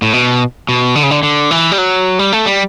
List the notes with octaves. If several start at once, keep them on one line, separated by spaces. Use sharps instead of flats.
A2
B2
B2
D3
C#3
D3
D3
E3
G3
F#3
G3
A3
G3